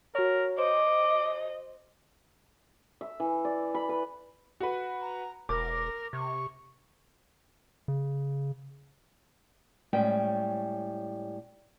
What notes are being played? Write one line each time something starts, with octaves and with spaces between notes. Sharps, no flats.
F#4 A#4 C#5
C5 D#5 D6
E5
E3
D5
B5
B4
F#4 B4
A#5
E1 A#4 D6
C3 C#6
C#3
A2 G3 G#3 C#4 G5